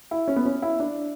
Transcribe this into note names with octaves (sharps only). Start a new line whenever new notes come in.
E4
C#4
B3
C#4
E4
D4